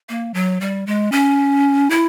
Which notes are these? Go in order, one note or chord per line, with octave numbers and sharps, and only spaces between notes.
A#3
F#3
G3
G#3
C#4
E4